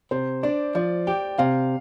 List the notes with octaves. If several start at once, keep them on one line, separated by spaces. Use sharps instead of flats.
C3 C5
D4 D5
F3 D5
G4 G5
C3 F5